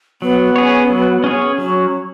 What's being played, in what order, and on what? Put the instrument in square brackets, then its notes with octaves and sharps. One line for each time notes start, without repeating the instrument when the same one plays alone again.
[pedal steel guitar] F#3 [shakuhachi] B3
[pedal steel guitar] C#4 G#4 C#5
F#3
C#4 G#4 C#5
[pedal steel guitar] F#3 [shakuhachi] C#4